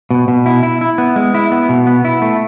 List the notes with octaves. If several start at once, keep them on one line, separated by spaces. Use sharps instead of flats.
B2
B2
E4
E4
E4
B3
G#3
E4
B3
B2
B3
E4
A3